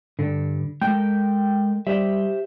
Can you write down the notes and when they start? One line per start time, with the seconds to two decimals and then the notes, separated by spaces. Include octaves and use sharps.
0.19 G2 D3
0.81 G#3 A4 A#4 G5
1.87 G3 G4 C5 E5